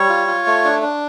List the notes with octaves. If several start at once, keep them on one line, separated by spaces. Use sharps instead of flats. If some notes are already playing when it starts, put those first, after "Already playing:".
Already playing: G3 C#5
F4
F4
A3
D4
D4